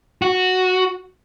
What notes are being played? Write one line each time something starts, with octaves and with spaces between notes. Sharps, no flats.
F#4